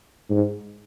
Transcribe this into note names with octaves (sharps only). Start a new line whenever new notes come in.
G#2